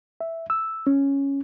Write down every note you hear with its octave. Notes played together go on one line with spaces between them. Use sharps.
E5
E6
C#4